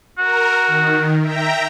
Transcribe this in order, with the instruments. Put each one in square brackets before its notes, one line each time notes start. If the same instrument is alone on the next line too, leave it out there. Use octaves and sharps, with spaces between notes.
[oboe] F#4 [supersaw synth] A#4
[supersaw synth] D#3
E5 G5 A#5